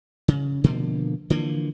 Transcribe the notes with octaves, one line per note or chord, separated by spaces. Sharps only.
C#3
B2 D3 F3 A#3
D3 E3 F3 A#3